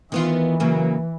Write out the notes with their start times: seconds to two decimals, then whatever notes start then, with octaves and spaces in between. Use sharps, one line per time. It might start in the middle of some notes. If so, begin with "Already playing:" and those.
0.12 D#3 E3 B3 F4
0.60 C#3 F#3 A#3